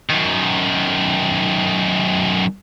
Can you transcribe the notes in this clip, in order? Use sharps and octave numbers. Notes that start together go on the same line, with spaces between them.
F#2 D#3